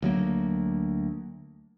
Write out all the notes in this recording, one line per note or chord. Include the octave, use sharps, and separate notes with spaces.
D2 F#3 A#3